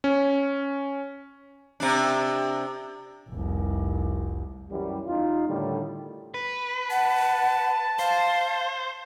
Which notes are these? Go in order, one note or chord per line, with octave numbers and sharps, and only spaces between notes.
C#4
C3 D4
F1 C2
F#2 E3 G3
E2 D#4 F4
A2 D3 D#3 G3
B4
F#5 A5
C5 F5